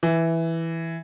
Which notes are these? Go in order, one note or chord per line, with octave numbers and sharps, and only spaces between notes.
E3